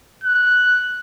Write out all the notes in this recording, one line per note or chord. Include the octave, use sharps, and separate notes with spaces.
F#6